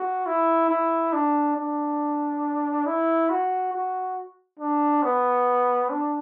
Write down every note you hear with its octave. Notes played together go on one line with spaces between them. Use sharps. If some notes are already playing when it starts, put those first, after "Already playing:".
Already playing: F#4
E4
E4
D4
D4
E4
F#4
F#4
D4
B3
D4